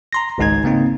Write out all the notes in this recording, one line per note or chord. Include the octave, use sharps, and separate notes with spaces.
A#5 C6 A#6
G#1 C#2 G#2 D#4 A#5 G#6
C#3 A#3 C4 D#4